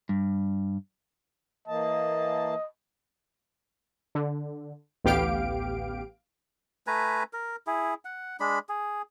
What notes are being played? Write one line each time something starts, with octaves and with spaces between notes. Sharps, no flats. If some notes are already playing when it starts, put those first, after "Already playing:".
G2
E3 A#3 D#5 A5
D3
A1 D2 B3 G4 F5 D7
A3 B4 G#5 A#5
A#4
E4 G#4
F#5
G#3 D4 B5
G#4